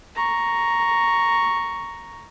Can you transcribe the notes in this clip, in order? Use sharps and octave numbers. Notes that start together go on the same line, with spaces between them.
A#5 C#6